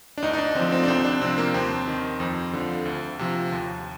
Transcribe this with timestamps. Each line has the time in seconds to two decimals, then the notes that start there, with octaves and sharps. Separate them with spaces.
0.18 D4
0.22 D2 D#4
0.33 D#4
0.38 D4
0.55 D3 F3 C4
0.72 C4
0.83 D4
0.88 C2 C4
1.05 D4
1.21 C3 F3 C4
1.38 A#3
1.54 D#2 C4
1.88 D#3
2.20 F2
2.53 D3 F3
2.85 D2
3.19 C3 F3
3.52 D#2